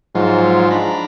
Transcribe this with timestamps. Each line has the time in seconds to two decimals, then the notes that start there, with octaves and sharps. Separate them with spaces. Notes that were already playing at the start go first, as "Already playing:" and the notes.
0.15 G#2 F3 F#3 F4
0.71 D4 A#5 B5